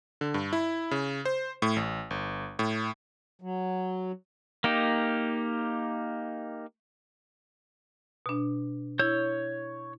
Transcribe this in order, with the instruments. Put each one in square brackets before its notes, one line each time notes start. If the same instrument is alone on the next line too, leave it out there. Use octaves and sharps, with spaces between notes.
[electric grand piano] D3
G2
E4
C#3
C5
A2
A1
G1
A2
[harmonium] F#3
[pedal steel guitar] A#3 D#4 G4
[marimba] B2 D4
[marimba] E4 [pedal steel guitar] C#5 G6